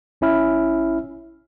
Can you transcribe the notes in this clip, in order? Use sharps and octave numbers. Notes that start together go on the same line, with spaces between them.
G#1 C#4 E4 F6